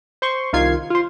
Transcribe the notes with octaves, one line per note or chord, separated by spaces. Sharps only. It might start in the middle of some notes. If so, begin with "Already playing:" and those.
C5 C6 C#6
C2 D#3 F4 G#6 C7
F4 C5